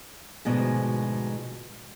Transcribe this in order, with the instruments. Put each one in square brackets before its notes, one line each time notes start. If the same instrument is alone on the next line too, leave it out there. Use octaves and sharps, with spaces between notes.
[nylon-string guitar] D2 G#2 B2 F3 G#3